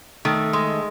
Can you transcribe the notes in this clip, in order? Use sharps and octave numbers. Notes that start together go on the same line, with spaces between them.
D#3 A3
G#3